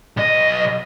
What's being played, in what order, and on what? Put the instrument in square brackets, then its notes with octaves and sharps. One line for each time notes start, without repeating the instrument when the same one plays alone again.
[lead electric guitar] B1 D#5